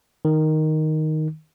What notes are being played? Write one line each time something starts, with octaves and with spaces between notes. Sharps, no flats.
D#3